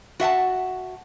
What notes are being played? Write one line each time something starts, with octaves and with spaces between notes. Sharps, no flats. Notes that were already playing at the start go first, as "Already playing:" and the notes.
F#4 E5 F#5 A5